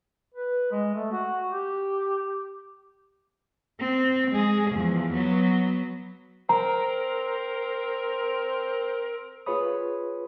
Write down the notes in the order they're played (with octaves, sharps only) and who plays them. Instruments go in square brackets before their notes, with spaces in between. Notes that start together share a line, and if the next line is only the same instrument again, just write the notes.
[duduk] B4
G#3
A3
F#4
G4
[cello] C4
G#3 G#4
E2 F3
F#3 B3
[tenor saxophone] C4 [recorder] A#4 [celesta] A#5
[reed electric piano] F4 G#4 B4 C#5 B5 D#6